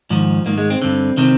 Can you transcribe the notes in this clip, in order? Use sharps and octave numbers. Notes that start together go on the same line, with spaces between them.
G#2 D#3 F3
G#2 D#3 A#3
G#3
C4
G2 D3 C4
C3 D#3 C4